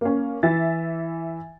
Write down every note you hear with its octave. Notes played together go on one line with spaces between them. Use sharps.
A#3 C#4
E3 E5 A6